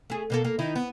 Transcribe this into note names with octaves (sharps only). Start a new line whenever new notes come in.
A3 G#4
B2 A#3 A4
A#3
D#3 D#4 E4
B3